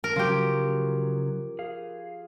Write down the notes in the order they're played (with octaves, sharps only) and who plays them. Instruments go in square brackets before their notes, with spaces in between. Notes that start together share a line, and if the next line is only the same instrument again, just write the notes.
[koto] A#4
[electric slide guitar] C#3 F#3 [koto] F3 G4
[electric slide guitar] G#4 F5